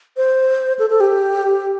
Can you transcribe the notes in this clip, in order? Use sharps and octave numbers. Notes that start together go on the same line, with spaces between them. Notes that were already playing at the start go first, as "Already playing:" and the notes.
C5
A4
A4
G4